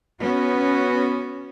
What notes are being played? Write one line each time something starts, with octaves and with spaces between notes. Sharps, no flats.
B3 C#4 F#4